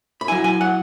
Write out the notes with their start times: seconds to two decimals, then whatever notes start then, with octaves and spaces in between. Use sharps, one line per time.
0.21 B5
0.28 F#3 E4 G#5
0.44 G#5
0.61 F#5